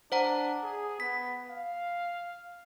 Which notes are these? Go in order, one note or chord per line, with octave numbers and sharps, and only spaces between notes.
D4 C5 F#5 A#5
G#4
B3 B6
F5